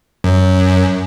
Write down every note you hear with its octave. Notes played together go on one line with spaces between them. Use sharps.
F#2